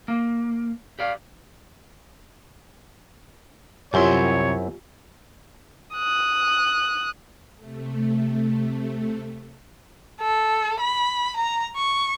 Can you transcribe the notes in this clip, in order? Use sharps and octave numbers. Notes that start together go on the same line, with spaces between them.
A#3
G4 D5 F5
C2 F#2 C4 E4 F4 G4 C#5 C6
D#6 F#6
C3 A3
A4
B5
A#5
C#6